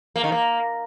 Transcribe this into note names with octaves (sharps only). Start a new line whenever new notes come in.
A#3
D#3
A#3